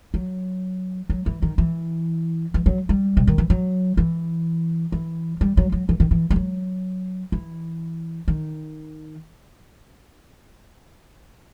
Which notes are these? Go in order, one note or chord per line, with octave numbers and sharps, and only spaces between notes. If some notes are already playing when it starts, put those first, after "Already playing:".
F#3
F#3
E3
D#3
E3
E3
F#3
G3
C3
D#3
E3
F#3
E3
E3
G3
F#3
F#3
E3
D#3
E3
G3
F#3
E3
D#3